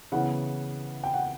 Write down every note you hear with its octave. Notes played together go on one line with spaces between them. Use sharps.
C#3 E3 B3 F#5
G5
F#5